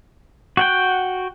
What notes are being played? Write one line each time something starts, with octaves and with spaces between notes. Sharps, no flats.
F#4 F#5 G5